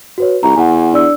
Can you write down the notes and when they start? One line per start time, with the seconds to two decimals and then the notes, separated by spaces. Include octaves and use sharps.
0.18 F#4 B4 C#5
0.43 C2 A#5
0.56 E2 F#5 G#5
0.93 D4 D5 E6